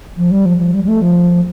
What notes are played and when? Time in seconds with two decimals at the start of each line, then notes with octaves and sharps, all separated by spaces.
0.17 F3
0.31 G3
0.45 F3
0.59 F3
0.74 G3
0.84 G3
0.88 A3
1.02 F3